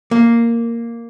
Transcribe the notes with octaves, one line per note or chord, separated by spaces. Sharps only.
A#3